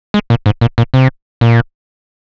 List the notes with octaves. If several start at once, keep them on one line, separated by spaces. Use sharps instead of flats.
G#3
A#2
G#2
A#2
A#2
C3
A#2